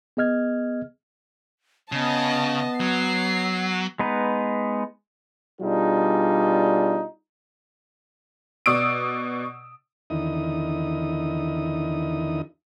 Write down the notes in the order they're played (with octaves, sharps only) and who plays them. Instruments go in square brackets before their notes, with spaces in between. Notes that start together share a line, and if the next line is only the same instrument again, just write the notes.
[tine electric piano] B3 G#4 D#5 F6 G#6
[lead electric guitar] C#3 [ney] B3 [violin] D#5 A5
[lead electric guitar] F#3 [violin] C7
[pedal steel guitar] G#3 B3 D#4 B4
[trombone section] B2 G3 D4 D#4 F4 G#4
[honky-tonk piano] B2 D5 D#6 E6 D7
[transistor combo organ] E2 D3 D#3 D#4 E4 D#6